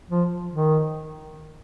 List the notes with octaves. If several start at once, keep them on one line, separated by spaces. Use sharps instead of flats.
F3
D#3